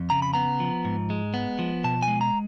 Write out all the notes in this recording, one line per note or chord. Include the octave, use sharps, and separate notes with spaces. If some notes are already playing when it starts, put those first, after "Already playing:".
Already playing: F2
C#3 A#5
B5
B3 A#5
F3
G#2
G#3
B3
F3
B2 A5
G#5
G#3
A#5